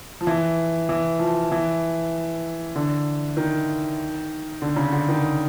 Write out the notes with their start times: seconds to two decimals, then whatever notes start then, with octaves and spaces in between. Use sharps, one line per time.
0.21 F3
0.27 E3
0.89 E3
1.19 F3
1.52 E3
2.76 D3
3.37 D#3
4.62 D3
4.76 C#3
4.93 D3
5.09 D#3